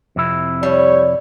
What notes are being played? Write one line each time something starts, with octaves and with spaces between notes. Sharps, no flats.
F2 C3 E4
G3 C#5